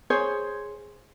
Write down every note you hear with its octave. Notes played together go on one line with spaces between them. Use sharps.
G#4 C5 C#5